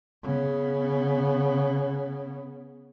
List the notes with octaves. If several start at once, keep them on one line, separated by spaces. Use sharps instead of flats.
C#3 B3